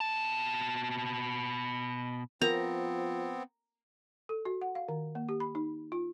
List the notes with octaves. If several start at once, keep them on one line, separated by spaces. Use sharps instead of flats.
B2 A5
F3 B3 C4 A#4 A#5
A4
F#4
F#5
F5
D#3
A#3
G4
B5
D#4
F4